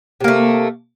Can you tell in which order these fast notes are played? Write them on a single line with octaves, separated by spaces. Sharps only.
C3 A#3 A3